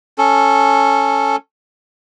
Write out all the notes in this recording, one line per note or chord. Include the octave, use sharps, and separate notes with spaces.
C#4 A4